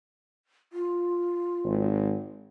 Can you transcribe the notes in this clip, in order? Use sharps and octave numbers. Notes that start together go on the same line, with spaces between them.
F4
G#1